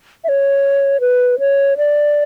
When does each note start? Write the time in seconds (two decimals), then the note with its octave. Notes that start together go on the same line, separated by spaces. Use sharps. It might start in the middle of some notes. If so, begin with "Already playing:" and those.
0.24 E5
0.28 C#5
1.00 B4
1.39 C#5
1.77 D5